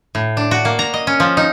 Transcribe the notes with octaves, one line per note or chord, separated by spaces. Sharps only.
A2
D4
F#4
A#3
A#5
D#5
C#4
F3
D#4